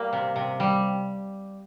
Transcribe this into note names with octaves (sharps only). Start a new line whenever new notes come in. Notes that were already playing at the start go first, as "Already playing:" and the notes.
Already playing: G3 A#3
C3
C3
G3